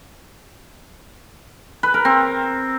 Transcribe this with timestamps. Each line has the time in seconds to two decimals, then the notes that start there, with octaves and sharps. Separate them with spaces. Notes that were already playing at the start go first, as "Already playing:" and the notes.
1.83 B4
1.94 A#4
2.05 C4